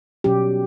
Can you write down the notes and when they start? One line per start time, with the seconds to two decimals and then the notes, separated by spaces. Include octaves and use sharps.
0.24 B2 F#3 C#4 G4